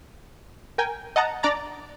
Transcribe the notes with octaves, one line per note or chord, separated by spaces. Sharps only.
A#4 G5 G#5
D#5 F#5 A5 A#5
D4 D5 A#5 A6